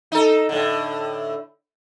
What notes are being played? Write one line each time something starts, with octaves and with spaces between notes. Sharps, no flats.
D#4 A4
A2 D3